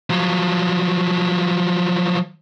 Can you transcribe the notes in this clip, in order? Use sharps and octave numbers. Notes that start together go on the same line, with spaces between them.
F3 F#3